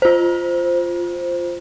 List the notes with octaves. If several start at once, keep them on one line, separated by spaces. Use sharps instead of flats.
F4 C5